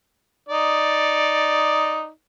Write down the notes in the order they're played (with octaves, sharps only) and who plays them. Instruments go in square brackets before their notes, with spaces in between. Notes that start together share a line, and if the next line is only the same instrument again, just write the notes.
[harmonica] D#4 D5